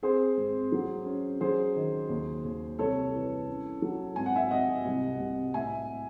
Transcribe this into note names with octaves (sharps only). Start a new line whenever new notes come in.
C4 G#4 C5
G#1
F#3
C#4
F#3 G#4 C5
D#3
D#2
D#2
C2 A4 C#5
E3
C#4
F#3
G#1 G#5
F#5
E5 G#5
G#1 D#5 F#5
C2
C2
A2 E5 G#5